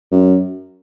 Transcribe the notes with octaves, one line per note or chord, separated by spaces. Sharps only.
F#2